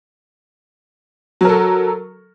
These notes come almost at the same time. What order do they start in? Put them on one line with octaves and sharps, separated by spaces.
F#3 A#4 A4